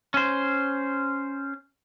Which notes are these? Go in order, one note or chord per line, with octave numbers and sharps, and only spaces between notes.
C#4 C5